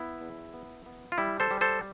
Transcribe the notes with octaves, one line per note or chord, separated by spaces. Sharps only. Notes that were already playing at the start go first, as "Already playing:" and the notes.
Already playing: B3 E4
E2
B3
B3
F4
G3 E4
A4 C5
G3
A4 C5